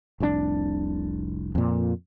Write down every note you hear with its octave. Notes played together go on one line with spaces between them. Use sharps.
F1 C2 A2 D4
F2 A#2